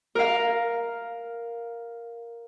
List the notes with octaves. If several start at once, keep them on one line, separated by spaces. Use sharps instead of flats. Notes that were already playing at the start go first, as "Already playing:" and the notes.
A#4 F5